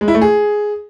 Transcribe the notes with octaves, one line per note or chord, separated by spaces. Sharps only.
G#3
E4
A3
G#4